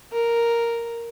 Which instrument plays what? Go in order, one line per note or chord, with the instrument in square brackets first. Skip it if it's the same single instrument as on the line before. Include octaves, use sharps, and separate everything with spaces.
[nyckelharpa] A#4